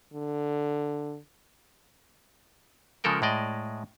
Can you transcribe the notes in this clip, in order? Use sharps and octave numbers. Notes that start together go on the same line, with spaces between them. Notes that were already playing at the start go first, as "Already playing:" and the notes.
D3
C#3 F3 G#3 A4 A#4 G5
A2 G#3 D5 D#5